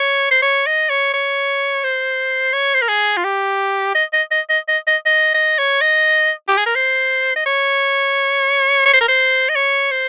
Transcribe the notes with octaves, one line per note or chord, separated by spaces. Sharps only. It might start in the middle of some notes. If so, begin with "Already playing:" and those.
Already playing: C#5
C5
C#5
D#5
C#5
C#5
C5
C#5
C5
A#4
G#4
F4
G4
D#5
D#5
D#5
D#5
D#5
D#5
D#5
D#5
C#5
D#5
G4
G#4
A#4
C5
D#5
C#5
C#5
C5
A#4
C5
D#5
C#5
C5